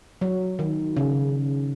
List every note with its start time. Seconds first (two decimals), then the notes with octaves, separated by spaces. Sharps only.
0.21 F#3
0.59 D#3
0.97 C#3